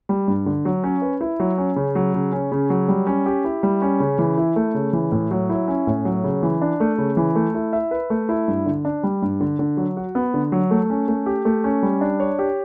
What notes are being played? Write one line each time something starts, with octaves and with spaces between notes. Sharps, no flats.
G3
G2
D3
F#3
C#4
B4
E4
F#3
C#4
C#3
F#3
C#3
C#4
C#3
F#3
G3
C#4
G4
E4
G3
C#4
C#3
E3
E4
A3
C#3
E3
A2
F#3
E4
C#4
A2
F#3
C#3
E3
D4
A3
C#3
E3
A3
E4
E5
B4
A3
E4
G2
D3
D4
G3
G2
D3
D3
F#3
F#4
B3
D3
F#3
A3
C#4
A3
G4
A3
C#4
G3
D4
C#5
G4